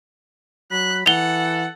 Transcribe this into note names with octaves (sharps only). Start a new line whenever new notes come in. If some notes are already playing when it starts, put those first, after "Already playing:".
F#3 B5 F#6
E3 A4 F#5 F7 G7